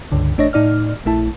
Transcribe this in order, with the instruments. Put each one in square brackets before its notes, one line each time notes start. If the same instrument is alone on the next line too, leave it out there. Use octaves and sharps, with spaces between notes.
[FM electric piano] C#2 G2 D3
A1 A3 D4 C#5 D#5 A#6
A2 D#4 D5 F6
A#1 A3 E4 A5